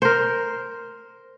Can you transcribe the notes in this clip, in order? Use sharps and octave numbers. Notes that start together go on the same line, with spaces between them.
A#4 C5